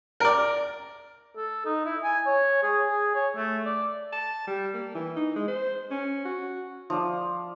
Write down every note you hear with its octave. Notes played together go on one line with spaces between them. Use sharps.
A#4 D5
A4
D#4
E4
G#5
C#5
G#4
G#4
C#5
A3
D5
A5
G3
A#3
E3
D#4
G#3
C5
C#4
F#4
F3 D5